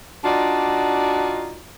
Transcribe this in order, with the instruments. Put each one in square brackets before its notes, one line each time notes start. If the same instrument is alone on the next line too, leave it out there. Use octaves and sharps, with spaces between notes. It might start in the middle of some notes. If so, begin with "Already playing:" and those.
[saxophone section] D4 D#4 F4 F#4 D5